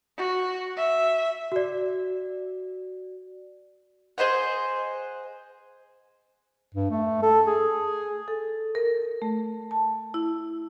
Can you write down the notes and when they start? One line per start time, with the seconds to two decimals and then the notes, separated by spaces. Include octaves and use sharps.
0.17 F#4
0.77 E5
1.52 F#4 D5
4.18 G#4 C5 D#5 F#5
6.75 G2
6.91 A3
7.23 A4
7.47 G#4
8.28 A4
8.75 A#4
9.22 A3
9.71 A5
10.14 E4